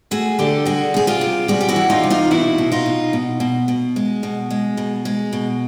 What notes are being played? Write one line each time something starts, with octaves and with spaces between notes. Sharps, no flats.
A3 F#4 G#4
D3 G4 A4
G3 F#4 G#4
C3 G#4
F4 G4
C3
G3 F#4 G#4
G4
E4 F#4
E3
D#4 F4
C3
D#4 F4
B2 E4 F#4
B2
D#4 F4
B2
B2
B2
B2
G#3
B2
G#3
B2
G#3
B2